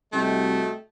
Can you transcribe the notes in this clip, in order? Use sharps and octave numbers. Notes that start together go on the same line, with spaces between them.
C2 A3 F#4 D#5 G5